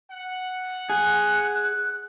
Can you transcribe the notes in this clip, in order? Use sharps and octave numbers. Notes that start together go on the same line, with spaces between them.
F#5
G#4 F#6